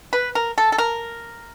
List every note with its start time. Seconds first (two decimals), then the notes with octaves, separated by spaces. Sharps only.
0.13 B4
0.35 A#4
0.58 A4
0.72 A4
0.78 A#4